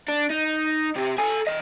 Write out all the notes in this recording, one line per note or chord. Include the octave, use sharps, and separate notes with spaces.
D4
D#4
C3 G4
A4 G#5
E3 D#5